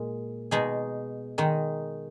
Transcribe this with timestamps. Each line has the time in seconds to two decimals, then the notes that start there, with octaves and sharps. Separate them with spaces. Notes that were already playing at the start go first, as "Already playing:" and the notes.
Already playing: A#2 G#3
0.51 B2 G#3 D#4 G#4
1.38 D#3 G#3 D#4